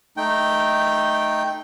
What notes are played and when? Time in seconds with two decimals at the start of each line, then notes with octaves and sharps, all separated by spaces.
0.17 A3 D#4 G5